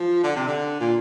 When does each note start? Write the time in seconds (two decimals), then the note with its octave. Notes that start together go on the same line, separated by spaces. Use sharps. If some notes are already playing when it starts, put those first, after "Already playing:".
Already playing: F3
0.24 D3
0.36 C3
0.47 D3
0.80 A#2